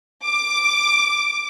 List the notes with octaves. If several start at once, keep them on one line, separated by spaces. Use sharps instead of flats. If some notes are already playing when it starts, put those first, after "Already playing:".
D6